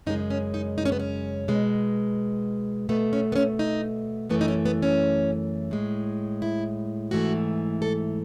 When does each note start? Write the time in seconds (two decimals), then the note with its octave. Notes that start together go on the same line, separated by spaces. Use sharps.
0.06 F#2 C#3 G#3 D#4
0.30 C#4
0.54 D#4
0.78 D#4
0.85 C#4
0.92 B3
0.99 C#4
1.48 B2 G#3
2.89 B2 A3 B3
3.13 C#4
3.32 B3
3.36 C#4
3.59 D#4
4.29 F#2 E3 A3 B3
4.41 D#4
4.48 C#4
4.65 B3
4.82 C#4
5.71 A2 G#3
6.42 E4
7.11 G#2 E3 A3 F#4
7.82 A4